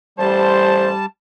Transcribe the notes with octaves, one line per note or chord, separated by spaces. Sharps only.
A1 G3 C5 A5